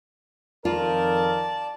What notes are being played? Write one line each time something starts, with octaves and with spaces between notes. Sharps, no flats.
F2 D#3 F4 A#4 D5 A5